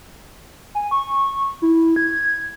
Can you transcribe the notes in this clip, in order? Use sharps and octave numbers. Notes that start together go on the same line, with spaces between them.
G#5
C#6
E4
G#6